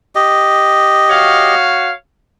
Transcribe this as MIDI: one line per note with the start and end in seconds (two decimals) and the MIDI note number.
0.15 1.55 67
0.15 1.55 75
1.10 1.91 66
1.10 1.91 73
1.10 1.91 77